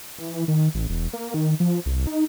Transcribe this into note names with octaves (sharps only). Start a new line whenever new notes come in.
E3
D#3
A1
E1
A#3
D#3
F3
C2
D#4